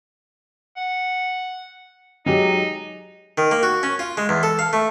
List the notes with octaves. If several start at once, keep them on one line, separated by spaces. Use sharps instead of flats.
F#5
F#3 G#3 D#4 G4
D#3
A#3
F#4
C#4
F4
G#3
E2
A4
F5
A3